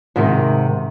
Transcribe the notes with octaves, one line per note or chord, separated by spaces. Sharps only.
G#2 C3 D#3 G#3